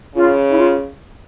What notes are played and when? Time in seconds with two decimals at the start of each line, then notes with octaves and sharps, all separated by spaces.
0.15 C#3 F4
0.49 E4
0.57 F4